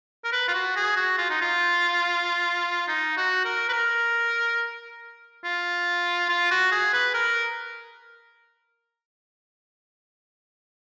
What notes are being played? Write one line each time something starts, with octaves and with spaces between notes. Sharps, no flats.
A#4
B4
F4
F#4
G#4
F#4
F4
D#4
F4
D#4
F#4
A#4
B4
A#4
F4
F4
F#4
G#4
B4
A#4